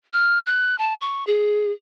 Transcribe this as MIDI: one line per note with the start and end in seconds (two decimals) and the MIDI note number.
0.13 0.39 89
0.46 0.78 90
0.78 0.94 81
1.01 1.26 85
1.27 1.72 68